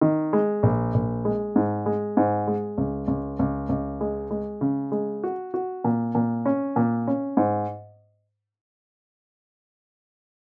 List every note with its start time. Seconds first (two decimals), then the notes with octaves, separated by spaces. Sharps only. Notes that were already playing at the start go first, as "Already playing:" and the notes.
0.01 D#3
0.33 G#3
0.63 A#1
0.94 A#1
1.25 G#3
1.56 G#2
1.86 G#3
2.17 G#2
2.47 G#3
2.78 C#2
3.08 C#2
3.39 C#2
3.69 C#2
4.01 G#3
4.31 G#3
4.61 C#3
4.92 G#3
5.24 F#4
5.54 F#4
5.84 A#2
6.15 A#2
6.46 C#4
6.76 A#2
7.07 C#4
7.37 G#2